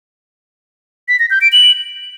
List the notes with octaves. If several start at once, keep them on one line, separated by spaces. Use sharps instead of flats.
B6
A#6
G6
D7
F#7